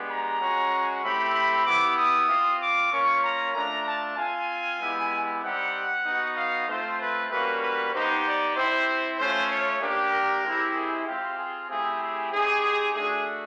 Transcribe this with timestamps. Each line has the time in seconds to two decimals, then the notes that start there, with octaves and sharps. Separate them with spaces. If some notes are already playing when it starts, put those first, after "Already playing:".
Already playing: G#3 B3 D4 G4
0.09 A#5
0.41 G#3 C#4 F#4
1.03 A3 C4 E4 G4 B5
1.34 B5
1.66 B3 E4 G4 D6
1.98 D#6
2.29 C4 F4
2.60 D6
2.92 A#3 C#4 F4 C#6
3.23 A#5
3.54 A3 D4 F4 A#5
3.86 A5
4.17 C4 F4 G#5
4.80 G#3 B3 E4 G4
5.42 G3 C4 D#4 G4 F#5
6.05 B3 D#4 F#4
6.36 F5
6.68 A3 C4 F4 C5
7.00 B4
7.30 G3 A#3 C#4 F#4 B4
7.61 B4
7.93 B3 D#4 G4 C5
8.25 D5
8.55 C4 E4 G4 C5
9.19 A3 C#4 F4 C5
9.50 C#5
9.81 A#3 D4 G4
10.12 A#4
10.44 G#3 C4 E4 G4
10.75 G#4
11.07 C4 F4 G4
11.37 G#4
11.69 A3 C4 E4 G4 G#4
12.01 G#4
12.32 C4 D#4 G4 G#4
12.94 A3 D4 F#4 G#4